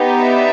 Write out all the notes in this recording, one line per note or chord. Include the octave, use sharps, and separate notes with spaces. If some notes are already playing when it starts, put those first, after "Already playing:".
Already playing: B3 D#4 G4
D5 E5